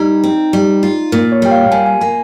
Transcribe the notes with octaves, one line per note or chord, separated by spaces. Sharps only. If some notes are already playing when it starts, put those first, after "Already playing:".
Already playing: G3 D#4
C4
G3
F4
A#2 A#4
C#5
G3 G5
F5
A#2 G#5
G#5
A#3 G#5